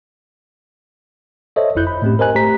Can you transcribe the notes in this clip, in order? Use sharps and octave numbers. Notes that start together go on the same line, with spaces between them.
A4 C5 C#5 D#5 E5
G1 F2 E4 F#6 G6
B5
A2 A3 C4 C#4 G4
A#4 C5 D#5 G#5 F#6
A3 G4 C5 A#5 B6